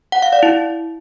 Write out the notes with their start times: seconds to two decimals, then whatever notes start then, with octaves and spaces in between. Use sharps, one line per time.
0.12 F#5
0.22 F5
0.33 D5
0.43 E4